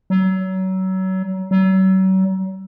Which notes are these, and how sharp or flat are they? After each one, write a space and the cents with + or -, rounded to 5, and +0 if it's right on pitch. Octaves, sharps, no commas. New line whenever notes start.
F#3 +30
F#3 +40